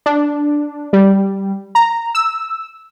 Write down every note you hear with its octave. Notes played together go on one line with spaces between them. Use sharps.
D4
G3
A#5
E6